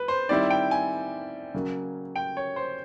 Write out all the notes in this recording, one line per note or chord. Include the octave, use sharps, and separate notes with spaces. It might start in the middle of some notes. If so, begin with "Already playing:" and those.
Already playing: B4
C5
D#3 G3 C4 E4 D5
G5
G#5
C#3 F#3 A#3
G5
C#5
C5